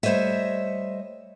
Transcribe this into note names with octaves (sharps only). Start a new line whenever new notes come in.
G3 A3 C5 C#5 D#5 E5